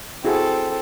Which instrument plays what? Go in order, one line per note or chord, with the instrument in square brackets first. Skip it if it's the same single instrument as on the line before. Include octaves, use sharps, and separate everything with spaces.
[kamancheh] C4 A4 [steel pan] E4 F#4 G#4